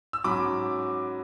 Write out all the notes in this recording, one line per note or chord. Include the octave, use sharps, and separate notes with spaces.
E6
G#2 F#3 C#4 B5 D6